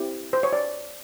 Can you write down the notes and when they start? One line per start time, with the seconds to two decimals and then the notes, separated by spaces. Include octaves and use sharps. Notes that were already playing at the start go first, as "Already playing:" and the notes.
Already playing: C4 E4 G4
0.33 C5
0.43 C#5
0.53 D5